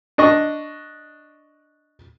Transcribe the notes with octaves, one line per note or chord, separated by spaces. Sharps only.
D4 D#5 C#6